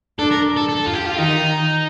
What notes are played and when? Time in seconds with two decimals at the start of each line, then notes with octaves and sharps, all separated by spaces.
0.19 D4 A4
0.31 A#4
0.56 A4
0.68 A4
0.86 F4
0.94 G4
1.06 F4
1.18 D#3 D#4